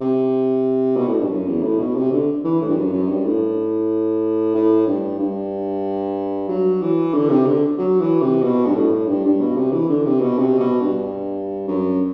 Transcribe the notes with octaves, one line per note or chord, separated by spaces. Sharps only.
C3
B2
A2
G2
F#2
E2
A2
B2
C3
D3
E3
A2
G2
F#2
F#2
G2
A2
A2
G2
G2
F#3
E3
D3
C3
D3
F#3
E3
C3
B2
G2
A2
G2
G2
B2
C3
E3
D3
C3
B2
C3
B2
G2
F#2